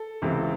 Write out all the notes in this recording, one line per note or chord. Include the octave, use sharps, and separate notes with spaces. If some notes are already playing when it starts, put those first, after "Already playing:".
Already playing: A4
C#2 C3 E3